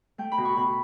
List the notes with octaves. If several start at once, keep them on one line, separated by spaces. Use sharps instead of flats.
A3 G5
B5
B2
C#6
B2 B5